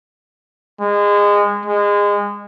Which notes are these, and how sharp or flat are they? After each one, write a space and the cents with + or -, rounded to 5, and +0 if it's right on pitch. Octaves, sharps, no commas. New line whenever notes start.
G#3 -25
G#3 -25